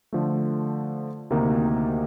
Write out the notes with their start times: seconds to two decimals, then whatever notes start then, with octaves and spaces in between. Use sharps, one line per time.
0.13 D3 F3 A3
1.30 D2 C3 D#3 A#3 D#4